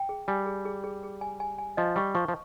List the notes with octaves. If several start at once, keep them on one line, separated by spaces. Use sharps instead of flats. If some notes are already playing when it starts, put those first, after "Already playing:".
Already playing: G5
G#4
G3 G#5
G#4
G#4
G#4
G#4
G#5
G#5
G#5
F3 D#5
G3 C#6
F3 C#6
F3